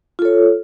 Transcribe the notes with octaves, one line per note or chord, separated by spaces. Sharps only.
F4 A4 C#5